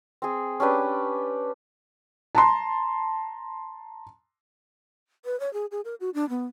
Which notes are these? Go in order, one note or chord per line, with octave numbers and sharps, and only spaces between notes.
C4 G#4
C#4 D4 G4 B4
A5 A#5 C6
B4
C#5
G#4
G#4
A#4
F#4
D4
B3